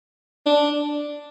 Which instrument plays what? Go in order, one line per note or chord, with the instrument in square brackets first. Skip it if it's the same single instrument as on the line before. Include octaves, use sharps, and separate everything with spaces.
[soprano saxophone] D4